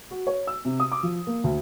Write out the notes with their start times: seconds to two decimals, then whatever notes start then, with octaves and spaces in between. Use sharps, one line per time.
0.11 F#4
0.27 C#5
0.47 E6
0.65 C3
0.80 D#6
0.92 D6
1.03 F3
1.27 A#3
1.44 D2